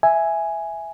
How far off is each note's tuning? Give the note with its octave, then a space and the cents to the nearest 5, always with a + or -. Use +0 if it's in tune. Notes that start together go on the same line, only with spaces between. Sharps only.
E5 +0 G#5 +0